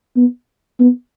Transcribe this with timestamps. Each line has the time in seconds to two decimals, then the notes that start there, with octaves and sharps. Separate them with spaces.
0.17 B3
0.80 B3